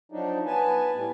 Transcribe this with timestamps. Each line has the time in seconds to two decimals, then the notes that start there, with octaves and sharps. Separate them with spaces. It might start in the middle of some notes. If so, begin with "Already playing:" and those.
0.12 F3 F#3 D4 D#4
0.46 B3 B4 G#5 A5
0.95 A2 G3